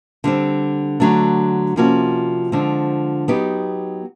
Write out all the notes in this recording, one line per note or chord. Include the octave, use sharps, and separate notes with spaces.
D3 G3 C4
D3 F#3 A3 D4
C3 F3 A#3 C#4 F#4
D3 F3 G#3 C4
F#3 B3 D#4 G4